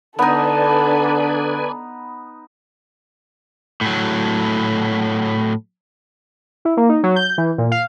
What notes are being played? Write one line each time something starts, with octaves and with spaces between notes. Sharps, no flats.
D3 B3 D4 D#4 A4 B4 D5 G#5
A2 F#3
E4
A#3
D#4
F#3
G6
E3
A#2
F5